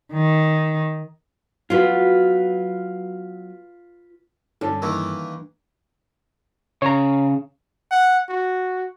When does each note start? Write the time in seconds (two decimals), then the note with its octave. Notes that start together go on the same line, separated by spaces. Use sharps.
0.13 D#3
1.70 F#3 B3 F4 B4
4.61 G2 D3 C#4 A4
4.82 D#3 E3 A#3
6.82 C#3 C#5 A#5
7.91 F#5
8.29 F#4